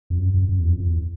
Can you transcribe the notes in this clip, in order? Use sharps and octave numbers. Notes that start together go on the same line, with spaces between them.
F2
F#2
F#2
F#2
E2
F2
F2
E2